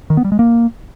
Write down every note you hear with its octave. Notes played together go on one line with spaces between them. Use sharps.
D#3
B3
G3
G#3
A#3